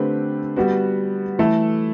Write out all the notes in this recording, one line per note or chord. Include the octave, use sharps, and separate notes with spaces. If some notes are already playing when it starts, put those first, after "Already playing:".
Already playing: D3 A3 C4 G4 B4
G3 B3 F#4
E3 A3 E4 A4